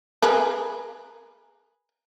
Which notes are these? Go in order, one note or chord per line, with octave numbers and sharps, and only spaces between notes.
G#4 A#4 B4